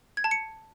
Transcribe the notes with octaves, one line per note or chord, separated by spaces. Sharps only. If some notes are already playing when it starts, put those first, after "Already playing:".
G#6
A5
C#7